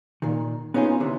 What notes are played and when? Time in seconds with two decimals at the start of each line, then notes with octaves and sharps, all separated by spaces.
0.22 A#2 D#3
0.74 B3 C#4 D#4 F4 G#4 C5
1.00 D2 C3 E3